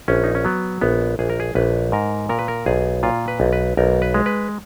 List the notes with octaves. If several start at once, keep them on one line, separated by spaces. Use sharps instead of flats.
A#1 C#4
D#4
C#4
F#3 B3
A#1 B3
A#1 G#4
A#4
G#4
A#1 B4
G#2 A#4
A#2 A#4
B4
A#4
B1 G#4
A#2 F4
B4
B1
B4
B1 A#4
B4
G#3
B4